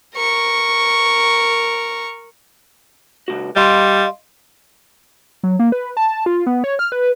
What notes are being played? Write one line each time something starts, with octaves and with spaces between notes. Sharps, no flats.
A#4 C#6
C#2 F#4
G3 D#5 F5 C6
F#3
A#3
B4
A5
F4
B3
C#5
F6
B4